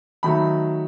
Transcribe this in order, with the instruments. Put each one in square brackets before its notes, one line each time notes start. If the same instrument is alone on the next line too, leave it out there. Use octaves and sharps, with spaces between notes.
[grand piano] D#3 F#3 A3 B5